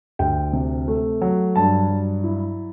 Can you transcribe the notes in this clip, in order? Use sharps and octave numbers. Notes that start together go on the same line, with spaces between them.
D2 G5
C3
A3
F#3
G2 A5
F#3
E4